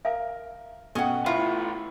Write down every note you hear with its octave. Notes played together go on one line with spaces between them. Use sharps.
A#4 E5 F5 G#5
B2 C#4 A4 F#5 G5
A3 E4 F4 B4